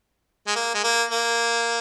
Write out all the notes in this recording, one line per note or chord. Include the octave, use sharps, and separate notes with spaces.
G#3
A#3
G#3
A#3
A#3